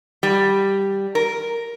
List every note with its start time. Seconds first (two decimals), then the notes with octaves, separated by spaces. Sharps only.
0.23 G3
1.15 A#4